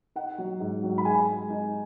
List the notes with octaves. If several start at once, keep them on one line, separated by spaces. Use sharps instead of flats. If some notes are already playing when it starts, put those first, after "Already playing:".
D#4 F#5
F#3
G#2
F#3
B5
G#3 G#5
G#3
D#4